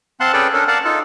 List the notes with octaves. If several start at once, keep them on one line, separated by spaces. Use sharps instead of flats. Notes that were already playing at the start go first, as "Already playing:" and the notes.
C4 F5 F#5 A5 C6 F#6
C#4 G#4 A4 B4 D5 G5
C#4 D4 A4 A#4
A#4 D5 F5 F#5 A5
D#4 F4 A4